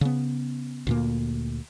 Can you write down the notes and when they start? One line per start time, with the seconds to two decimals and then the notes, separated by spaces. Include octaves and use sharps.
0.01 C#3 B3
0.87 D2 A#2 A#3